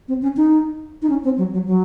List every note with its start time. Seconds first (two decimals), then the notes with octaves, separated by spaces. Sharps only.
0.08 C4
0.22 C#4
0.37 D#4
1.02 D#4
1.09 C#4
1.24 C4
1.38 F#3
1.53 F#3
1.67 F#3